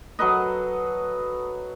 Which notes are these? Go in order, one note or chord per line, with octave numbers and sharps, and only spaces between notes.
F#3 A4 B4 D#5